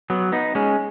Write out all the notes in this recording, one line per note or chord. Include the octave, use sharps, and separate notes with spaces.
F#3 B3
B3 D#4
G#3 C#4